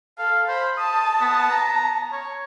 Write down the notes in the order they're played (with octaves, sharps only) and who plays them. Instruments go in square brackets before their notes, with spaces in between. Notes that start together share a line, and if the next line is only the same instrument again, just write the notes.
[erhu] A4 [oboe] F5
[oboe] C5 [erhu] B5
[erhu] A5 [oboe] D#6
[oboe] B3
A#5
C#5